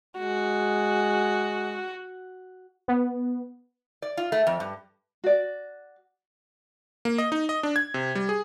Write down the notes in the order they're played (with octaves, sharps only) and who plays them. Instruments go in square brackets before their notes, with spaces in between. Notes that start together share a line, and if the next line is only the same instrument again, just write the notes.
[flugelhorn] G#3 [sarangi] F#4
[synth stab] B3
[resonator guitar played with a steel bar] D5
F4
A3
F2
G2
[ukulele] F#4 D5
[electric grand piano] A#3
D#5
D#4
D#5
D4
G#6
C3
G3
G#4